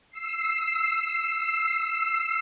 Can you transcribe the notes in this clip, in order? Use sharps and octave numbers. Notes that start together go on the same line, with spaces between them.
E6 C7